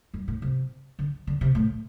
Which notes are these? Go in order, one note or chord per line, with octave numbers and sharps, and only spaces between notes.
G2
A2
C3
D3
D3
C3
A2